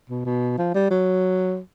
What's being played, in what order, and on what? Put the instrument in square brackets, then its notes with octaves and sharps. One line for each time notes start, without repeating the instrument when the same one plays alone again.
[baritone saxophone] B2
B2
F3
G3
F#3